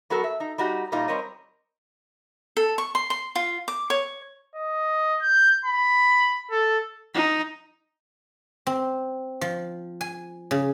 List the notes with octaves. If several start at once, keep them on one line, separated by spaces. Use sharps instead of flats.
F#3 B3 F#4 A4 A#4
E5
D#4
G3 D#4 F#4 G4
A#2 G3 A#3 D#4 F4
G3 C4 A#4 C#5 D#5
A4
C#6
C6
C6
F4
D6
C#5
D#5
G6
B5
A4
D#4
C4
F3
G#5
C#3